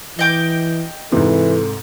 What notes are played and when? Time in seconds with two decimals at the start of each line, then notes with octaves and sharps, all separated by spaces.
0.19 E3 D#5 G5 D6
1.12 G#2 C3 E3 A4